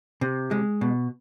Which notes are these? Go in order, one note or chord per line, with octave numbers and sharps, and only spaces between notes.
C3
G#3
B2